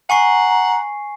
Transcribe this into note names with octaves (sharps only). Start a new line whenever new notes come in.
F#5 G#5 A#5 C#6 C7